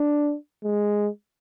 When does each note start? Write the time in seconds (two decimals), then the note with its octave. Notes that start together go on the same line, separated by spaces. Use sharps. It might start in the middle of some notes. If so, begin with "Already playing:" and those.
Already playing: D4
0.64 G#3